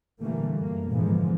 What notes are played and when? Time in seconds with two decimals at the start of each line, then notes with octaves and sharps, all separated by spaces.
0.21 A#2 D3 E3 G3 A3 A#3
0.55 F#2 A#3
0.89 G#2 B2 D3 E3 F3 G#3